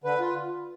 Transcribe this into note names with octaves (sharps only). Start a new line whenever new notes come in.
D3 B4
F4